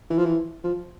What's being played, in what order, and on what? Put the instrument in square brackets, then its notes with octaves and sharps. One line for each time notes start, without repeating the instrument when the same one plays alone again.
[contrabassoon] E3
F3
E3
F3